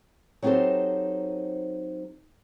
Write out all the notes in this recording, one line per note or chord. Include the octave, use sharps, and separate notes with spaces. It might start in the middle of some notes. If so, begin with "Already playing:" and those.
F#3 C4 D#4 G4 A4 C5